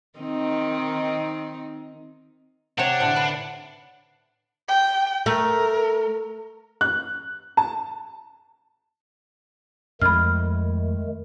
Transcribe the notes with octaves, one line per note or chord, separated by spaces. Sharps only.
D#3 C4 D#4
C3 D4 C#5 F#5
A2 D3
B4
G5
A3 A#4
F#6
A5
F2 D#3 G#3 A3 B5 F6